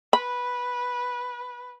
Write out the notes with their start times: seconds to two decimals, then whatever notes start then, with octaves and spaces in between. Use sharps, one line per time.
0.13 B4 B5